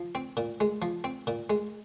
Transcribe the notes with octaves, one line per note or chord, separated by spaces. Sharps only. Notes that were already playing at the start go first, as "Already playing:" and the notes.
Already playing: F3
C4
A#2
G#3
F3
C4
A#2
G#3